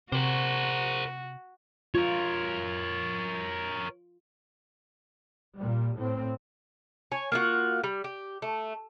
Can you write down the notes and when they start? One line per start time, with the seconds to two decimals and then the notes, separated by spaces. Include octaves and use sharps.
0.12 C3 F#4 A#4 C5
1.95 F4 A#4 C#5
5.56 A#2 G3
5.97 A2 C4
7.12 C#5 G#5
7.32 A#3 F4 F#4
7.84 G3
8.04 G4
8.42 A3